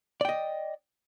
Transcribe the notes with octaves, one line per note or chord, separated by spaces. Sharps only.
D5 D#5 G5